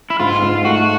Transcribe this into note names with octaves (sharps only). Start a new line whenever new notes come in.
E4
G#2 F4
G#2
A3 F#4